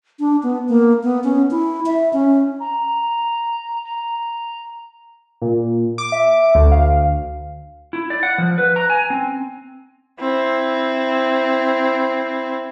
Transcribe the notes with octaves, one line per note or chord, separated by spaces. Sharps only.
D4
B3
A#3
B3
C#4
E4
E5
C#4
A#5
A#5
A#2
D6
E5
D2
F5
E4
D5
F#5
F3
B4
A#5
G#5
C4
C4 E4